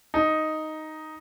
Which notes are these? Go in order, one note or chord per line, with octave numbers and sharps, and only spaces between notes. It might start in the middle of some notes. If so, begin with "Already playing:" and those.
D#4